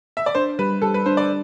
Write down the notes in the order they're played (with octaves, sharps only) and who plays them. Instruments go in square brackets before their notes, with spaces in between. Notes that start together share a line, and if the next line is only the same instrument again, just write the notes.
[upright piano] E5
D5
[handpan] D4 [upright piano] C5
[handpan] G3 [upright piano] B4
[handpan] G3 [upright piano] A4
[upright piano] B4
[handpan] D4 [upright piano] C5
[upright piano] D5